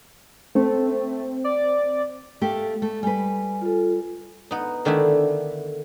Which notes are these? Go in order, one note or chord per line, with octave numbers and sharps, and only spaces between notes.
A3 C4
D5
A3 A#3 G4
A3
G3 B4 G#5
F4 A4
B3 D#4
D3 D#3 A3 D4 E4